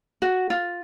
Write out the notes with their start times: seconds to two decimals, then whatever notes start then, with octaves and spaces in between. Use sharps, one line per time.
0.22 F#4
0.50 F4